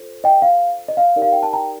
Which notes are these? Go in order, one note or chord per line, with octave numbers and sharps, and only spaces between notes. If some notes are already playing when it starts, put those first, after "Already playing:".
Already playing: F4 A4 C5
D#5 G5
F5
D#5
F5
D#4 G4 A#4 D5
F5
G5
A5
G5 A#5